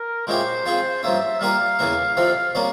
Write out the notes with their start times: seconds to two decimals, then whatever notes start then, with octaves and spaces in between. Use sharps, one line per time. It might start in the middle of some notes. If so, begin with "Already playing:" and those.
Already playing: A#4
0.27 A#2 G#3 C#4 E4 G4 C5
0.66 F3 C4 F4 G#4
1.03 G2 F3 A#3 C#4 E5
1.40 G3 A#3 F4 A#4 F5
1.79 E2 C#3 E3 A#3 E4
2.17 F2 C3 F3 C4
2.55 C3 G3 A#3 C#4